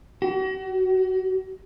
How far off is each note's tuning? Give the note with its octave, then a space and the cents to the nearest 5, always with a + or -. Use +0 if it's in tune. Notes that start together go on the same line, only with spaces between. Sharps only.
F#4 +40